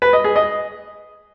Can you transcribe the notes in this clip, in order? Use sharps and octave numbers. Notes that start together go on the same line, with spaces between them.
B4
D#5
G#4
D#5